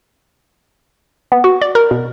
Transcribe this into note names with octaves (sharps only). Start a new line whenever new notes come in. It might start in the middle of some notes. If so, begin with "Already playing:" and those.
B3
F#4
D5
A#4
B2